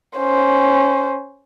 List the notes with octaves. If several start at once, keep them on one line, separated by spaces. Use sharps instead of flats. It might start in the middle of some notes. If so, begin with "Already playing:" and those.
C#4 C5